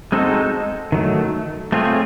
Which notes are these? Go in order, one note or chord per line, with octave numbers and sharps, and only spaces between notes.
G#3 C4 D#4 F#4 A4
D#3 F#3 A3
A3 C4 F4 G#4 C#5